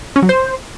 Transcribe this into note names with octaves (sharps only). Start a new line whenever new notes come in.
C#4
F#3
C5